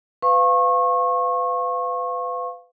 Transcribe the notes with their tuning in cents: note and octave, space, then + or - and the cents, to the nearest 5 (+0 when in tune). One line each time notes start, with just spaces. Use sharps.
B4 +30 F5 +0 C#6 -30